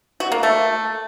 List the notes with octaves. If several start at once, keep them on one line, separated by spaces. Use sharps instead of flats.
F#4
A#3
A3